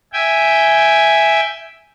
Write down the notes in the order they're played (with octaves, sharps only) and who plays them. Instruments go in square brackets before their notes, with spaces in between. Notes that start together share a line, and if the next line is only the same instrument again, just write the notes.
[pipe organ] E5 G5 G#5